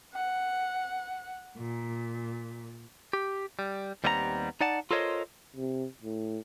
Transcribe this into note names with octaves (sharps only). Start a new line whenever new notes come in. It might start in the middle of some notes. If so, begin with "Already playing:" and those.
F#5
A#2
G4
G3
D#2 G3 B3 C4 D#5 A#5
D#4 D5 F#5 A5
F4 A4 A#4 C5 C#5 D#5
C3
A2